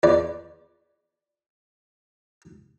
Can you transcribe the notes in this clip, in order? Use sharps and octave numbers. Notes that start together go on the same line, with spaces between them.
E2 D5